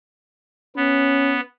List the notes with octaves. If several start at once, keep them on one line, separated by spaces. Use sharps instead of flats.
B3 C#4